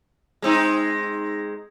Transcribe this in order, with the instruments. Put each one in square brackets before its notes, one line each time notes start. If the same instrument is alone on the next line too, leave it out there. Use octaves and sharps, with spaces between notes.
[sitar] G#3 C4 D#4